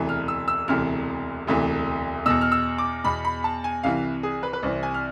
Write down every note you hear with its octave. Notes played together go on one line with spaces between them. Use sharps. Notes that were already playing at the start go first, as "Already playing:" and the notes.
Already playing: E1 D2 C3 E3
F6
E6
E6
E1 D2 C3 E3 F6
E1 D2 C3 E3
E2 B2 E6
F6
E6
D6
E2 B2 B5
B5
A5
G#5
C2 C3 E3 F5
G#4
B4
B4
C2 C3 E3 C5
G#5
F6